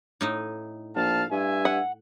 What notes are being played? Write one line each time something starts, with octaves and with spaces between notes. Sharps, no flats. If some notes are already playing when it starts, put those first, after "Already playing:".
A2 D#4 D#5
A#1 F5 A5
G2 E5 G#5
F#5